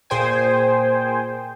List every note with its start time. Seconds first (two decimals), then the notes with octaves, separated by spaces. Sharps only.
0.10 A#2 G#4 C5 G5 G#5